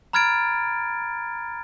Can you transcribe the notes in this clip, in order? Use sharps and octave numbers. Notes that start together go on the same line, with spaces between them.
A#5 B5 F6 G#6 A6 D7